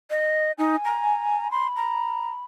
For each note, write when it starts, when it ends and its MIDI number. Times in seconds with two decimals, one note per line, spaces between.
0.10 0.52 75
0.58 0.76 63
0.58 1.47 80
0.85 1.51 82
1.51 2.45 83
1.51 1.67 84
1.76 2.30 82